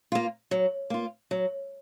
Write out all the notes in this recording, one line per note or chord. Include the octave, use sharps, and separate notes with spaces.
A#3 F4
F#3
A#3 F4
F#3